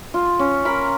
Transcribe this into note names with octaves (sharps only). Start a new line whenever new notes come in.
F4
C#4
A#4 B5